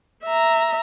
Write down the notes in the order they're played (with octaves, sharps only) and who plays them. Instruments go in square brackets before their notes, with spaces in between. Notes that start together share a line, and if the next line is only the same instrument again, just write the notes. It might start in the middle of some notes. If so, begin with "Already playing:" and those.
[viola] E5 A#5